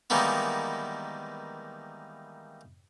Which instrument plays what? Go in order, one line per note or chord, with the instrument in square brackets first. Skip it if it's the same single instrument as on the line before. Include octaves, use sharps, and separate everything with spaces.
[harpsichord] D#3 E3 G3 G#3 A#3 B3